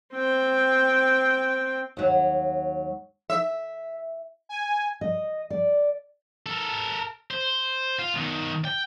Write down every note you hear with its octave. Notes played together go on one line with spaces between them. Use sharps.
C4 G5
D#2 F#3
E5
G#5
D#5
D5
A4 A#4
C5
F4
B1 D#3
G5